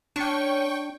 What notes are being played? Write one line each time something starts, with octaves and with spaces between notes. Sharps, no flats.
C#4 D4 G5 C#6